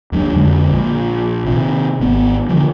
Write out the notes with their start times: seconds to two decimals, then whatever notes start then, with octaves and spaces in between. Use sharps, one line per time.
0.12 D#2 F#3 D4
0.36 F2 D3 G#3
0.71 A#1
1.46 C3 D#3
2.00 G#1 B3
2.49 D3 E3 F3